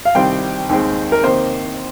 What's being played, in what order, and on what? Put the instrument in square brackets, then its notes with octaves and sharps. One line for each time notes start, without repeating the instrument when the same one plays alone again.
[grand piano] F5
[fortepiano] C2 C3 D#3 G3 C4 [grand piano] G5
[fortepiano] D#2 D#3 G#3 C4
[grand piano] A#4
[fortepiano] C3 D#3 A#3 [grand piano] C5